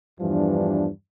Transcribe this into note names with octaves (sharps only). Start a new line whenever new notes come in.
E2 G2 E3 F3 G3 D4